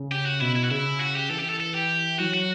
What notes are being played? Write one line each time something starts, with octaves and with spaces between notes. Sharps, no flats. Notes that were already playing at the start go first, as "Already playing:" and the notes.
Already playing: C#3
G4
F#4
B2 E4
E4
F#4
C#3 E4
F#4
G4
E3 A4
G4
A4
A4
G4
F#3 F#4
F#4